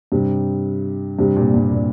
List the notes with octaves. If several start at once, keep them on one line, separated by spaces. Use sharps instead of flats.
G2 C3
G2 C3
A#2
G2
A#2